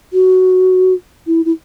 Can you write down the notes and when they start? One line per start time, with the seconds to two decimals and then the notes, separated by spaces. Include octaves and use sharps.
0.13 F#4
1.27 E4
1.45 E4